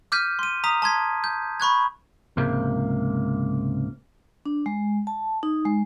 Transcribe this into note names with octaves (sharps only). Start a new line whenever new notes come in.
D6 F6 G6 B6 D#7
C6 D#7
A#5 D#6 B6
A5 C6 G#6 B6
G6
B5 C#6 F#6 G#6
C#2 G#2 C3 F3 A#3
D4
G#3
A5
D#4
G#3